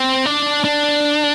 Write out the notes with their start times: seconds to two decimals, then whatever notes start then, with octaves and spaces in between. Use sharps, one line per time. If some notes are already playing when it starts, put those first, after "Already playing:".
Already playing: C4
0.26 D4
0.64 D4